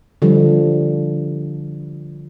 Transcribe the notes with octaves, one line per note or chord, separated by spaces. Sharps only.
D3 F3 G3